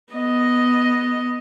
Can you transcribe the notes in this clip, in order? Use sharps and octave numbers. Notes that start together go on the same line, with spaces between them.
B3 D#5